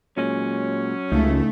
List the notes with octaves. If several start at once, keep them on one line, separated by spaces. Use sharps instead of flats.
A#2 F#3 G#3 C#4
C#2 A2 C#3 A3 D#4